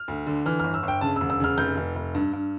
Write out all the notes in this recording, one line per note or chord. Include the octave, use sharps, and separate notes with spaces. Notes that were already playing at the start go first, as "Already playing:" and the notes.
Already playing: F6
D2
D3
E3 F6
G1 F6
E6
G1
G5
C#3 A5
E6
E1
E6
C#3 F6
F1 G6
F1
F1
G2
G2